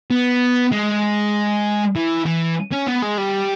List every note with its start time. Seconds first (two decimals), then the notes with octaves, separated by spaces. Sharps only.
0.11 B3
0.72 G#3
1.96 E3
2.26 E3
2.72 C#4
2.87 B3
3.02 G#3
3.18 G3